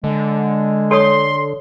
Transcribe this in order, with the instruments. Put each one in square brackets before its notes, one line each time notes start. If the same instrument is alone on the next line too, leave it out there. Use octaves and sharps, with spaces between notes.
[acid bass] D3 [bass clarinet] G#3
[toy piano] A4 C#5 D#6 [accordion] C6